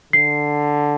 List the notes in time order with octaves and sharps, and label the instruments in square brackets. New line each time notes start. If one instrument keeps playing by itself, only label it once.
[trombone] D3 [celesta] C7